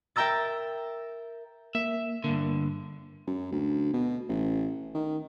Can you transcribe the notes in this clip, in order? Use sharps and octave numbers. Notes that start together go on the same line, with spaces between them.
A#4 E5 G5 A#5 E6 A6
A#3 E5
G2 D3 A#3
F#2
D2
B2
A1
D#3